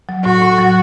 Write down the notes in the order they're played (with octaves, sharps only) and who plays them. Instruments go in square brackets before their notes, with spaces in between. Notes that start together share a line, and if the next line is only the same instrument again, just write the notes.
[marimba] F#3
[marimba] A2 [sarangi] F#4
[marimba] A2
F#3